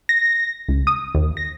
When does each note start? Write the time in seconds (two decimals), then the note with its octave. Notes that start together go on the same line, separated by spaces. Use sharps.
0.09 A#6
0.69 C#2
0.87 D#6
1.15 D#2
1.37 A#6